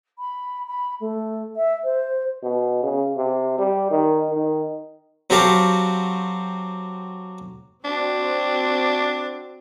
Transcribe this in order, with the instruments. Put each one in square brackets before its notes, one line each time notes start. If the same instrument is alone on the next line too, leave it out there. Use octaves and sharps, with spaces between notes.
[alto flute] B5
B5
A3
E5
C5
[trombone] B2
C#3
C3
G3
D#3
D#3
[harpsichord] F#3 C4 F#4 G4 A4 F5
[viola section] C4 F#4 [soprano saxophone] D4